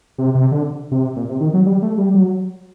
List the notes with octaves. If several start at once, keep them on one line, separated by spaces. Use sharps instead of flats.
C3
C3
D3
C3
A#2
C3
D#3
F#3
G3
A3
G3
F#3